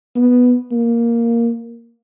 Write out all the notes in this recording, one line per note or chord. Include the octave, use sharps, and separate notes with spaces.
B3
A#3